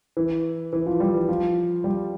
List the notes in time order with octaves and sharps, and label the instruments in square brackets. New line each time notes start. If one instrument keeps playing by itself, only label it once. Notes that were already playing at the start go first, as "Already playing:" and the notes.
[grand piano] E3
E3
F3
G3
E3
F3
G3